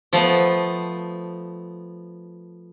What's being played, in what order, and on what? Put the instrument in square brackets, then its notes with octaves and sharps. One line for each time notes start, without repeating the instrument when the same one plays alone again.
[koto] F3 A3 B3